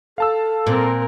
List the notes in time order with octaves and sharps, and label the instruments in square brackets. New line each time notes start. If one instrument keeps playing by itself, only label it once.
[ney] A4 [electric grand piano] F5 A5 E6
[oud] A#2 [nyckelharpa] C4 A#4